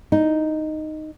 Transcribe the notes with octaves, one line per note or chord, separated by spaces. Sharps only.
D#4